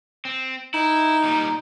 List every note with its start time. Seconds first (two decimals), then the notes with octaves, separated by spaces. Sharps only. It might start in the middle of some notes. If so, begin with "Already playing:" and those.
0.25 C4
0.74 D#4 E4
1.24 A#2 G3